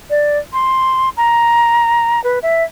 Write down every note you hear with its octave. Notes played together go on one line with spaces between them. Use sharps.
D5
C6
A#5
B4
E5